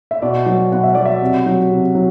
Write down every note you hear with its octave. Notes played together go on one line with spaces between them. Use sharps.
E5
B2 D5
F#3
B2 F#5
E5
F#3 D5
E5
C3
F#3
C3
F#3